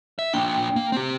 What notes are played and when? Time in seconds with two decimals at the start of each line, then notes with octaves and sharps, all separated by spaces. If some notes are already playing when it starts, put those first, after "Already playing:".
0.19 E5
0.34 A#3 D4 G5
0.76 A#3
0.92 C4 G4